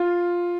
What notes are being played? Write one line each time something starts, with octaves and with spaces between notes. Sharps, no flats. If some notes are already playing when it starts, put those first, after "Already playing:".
Already playing: F4